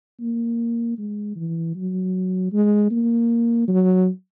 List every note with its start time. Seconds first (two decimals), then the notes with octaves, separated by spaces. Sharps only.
0.20 A#3
0.98 G#3
1.36 E3
1.76 F#3
2.53 G#3
2.91 A#3
3.68 F#3